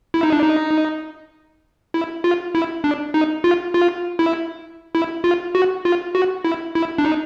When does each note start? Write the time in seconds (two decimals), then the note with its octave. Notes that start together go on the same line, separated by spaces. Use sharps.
0.14 E4
0.23 D#4
0.32 D4
0.42 D#4
1.94 E4
2.24 F4
2.55 E4
2.84 D4
3.14 D#4
3.44 F4
3.74 F4
4.19 E4
4.95 E4
5.24 F4
5.55 F#4
5.85 F4
6.15 F#4
6.45 E4
6.75 E4
6.98 D4
7.05 D#4